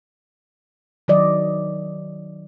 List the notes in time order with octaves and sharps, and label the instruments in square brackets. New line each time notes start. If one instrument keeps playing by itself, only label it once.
[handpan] D#3 F#3 D5 D#5